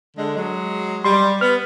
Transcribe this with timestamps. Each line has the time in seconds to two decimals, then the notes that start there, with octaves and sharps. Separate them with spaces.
0.17 D3 G#3
0.36 F#3 G#3
1.05 G3 C6
1.41 B3 F6